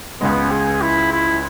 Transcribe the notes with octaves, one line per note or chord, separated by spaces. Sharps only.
C#2 C#3 G#3 B3
G#4
E4
E4